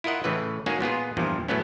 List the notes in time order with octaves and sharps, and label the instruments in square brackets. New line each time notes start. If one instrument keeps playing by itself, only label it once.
[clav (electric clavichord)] E4 F4 A#4 D#5 F#5
A2 C#3 E3 B4
G#3 A#3 C#4 D#4 F#4 G#4
A#2 B3 F4 G#4
E2 G2 A#2 F3
A2 F#3 A3 B3 C#4